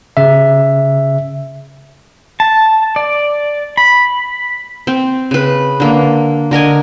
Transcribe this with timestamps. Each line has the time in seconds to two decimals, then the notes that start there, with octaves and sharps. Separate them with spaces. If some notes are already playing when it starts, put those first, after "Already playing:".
0.17 C#3 E5
2.40 A5
2.96 D5
3.77 B5
4.87 C4
5.31 C#3 B4
5.80 D3 A#3
6.51 D3 A#4 D#5 G#5